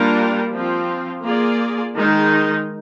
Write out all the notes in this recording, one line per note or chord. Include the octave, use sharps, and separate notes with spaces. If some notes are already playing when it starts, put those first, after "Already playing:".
Already playing: G3 A#3 D4 F4 A#4
F3 C4 F4
A#3 F4 G#4 D5
D#3 G#3 D#4